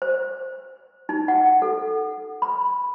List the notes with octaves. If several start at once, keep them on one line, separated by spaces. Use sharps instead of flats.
C5
D#4
F#5
A4
B5